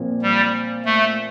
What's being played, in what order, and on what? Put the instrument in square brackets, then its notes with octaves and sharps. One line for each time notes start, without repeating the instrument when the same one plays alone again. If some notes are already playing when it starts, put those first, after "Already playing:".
Already playing: [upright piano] A#2 F3 C4
[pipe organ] G3
A3